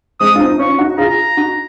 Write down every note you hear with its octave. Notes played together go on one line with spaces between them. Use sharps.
G#3 C4 D#6
F4
C4 D#4
D#4
C#4 F4 C#6
D#4 F#4
F4 G#4 A#5
D#4 F#4